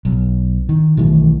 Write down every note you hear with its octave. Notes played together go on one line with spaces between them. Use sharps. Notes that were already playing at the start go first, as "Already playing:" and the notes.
B1
D#3
B1 D#3 E3 A3